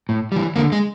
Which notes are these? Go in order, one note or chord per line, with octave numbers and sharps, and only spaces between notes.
A2
E3 G3
D3 A#3
G#3